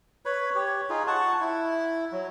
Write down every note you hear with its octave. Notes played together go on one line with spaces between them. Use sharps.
B4 C#5 B5
G4 C#5
D#4 F4 G#4
F#5 A5 C#6
E4
F#3